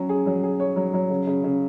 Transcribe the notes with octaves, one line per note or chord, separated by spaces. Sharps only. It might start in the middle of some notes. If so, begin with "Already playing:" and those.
Already playing: F#3 C#4
G#4
F#3
G#4
C#5
F#3
F#3
C#3
C#3
C#3